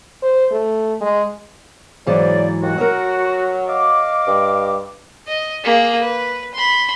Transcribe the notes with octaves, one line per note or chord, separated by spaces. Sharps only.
C5
A3
G#3
G#2 C#3 E3 F#3 C5 D5
D#2 F#4
F#3 A#4 C#5
D#5 F5 D6
G2
D#5
A#3 G#4
B4
B5 C6